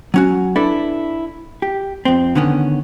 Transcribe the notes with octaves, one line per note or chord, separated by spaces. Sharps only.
F#3 C#4 F#4
D4 E4 A4 B4 D5
G4
F2 C4
D3 D#3 B3 C#4